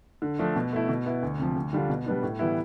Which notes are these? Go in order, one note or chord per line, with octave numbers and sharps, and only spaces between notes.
D3
F3 A3 D4
B2
A3 E4
B2
B3 E4
D2
C3 F3
D2
D3 G3 D4 F4
B2
G3 B3 D4
A2
E3 G3 B3 E4